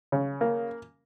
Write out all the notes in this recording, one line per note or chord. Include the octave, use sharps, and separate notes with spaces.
C#3
A#3